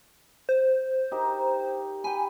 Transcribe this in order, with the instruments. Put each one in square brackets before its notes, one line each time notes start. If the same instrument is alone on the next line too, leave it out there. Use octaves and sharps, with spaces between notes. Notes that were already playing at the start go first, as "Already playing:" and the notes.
[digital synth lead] C5
[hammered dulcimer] D#4 G4 A#4
[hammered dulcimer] G5 B5 [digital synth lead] G#5